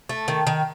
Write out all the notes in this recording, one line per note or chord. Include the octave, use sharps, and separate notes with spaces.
A3
D#3
D#3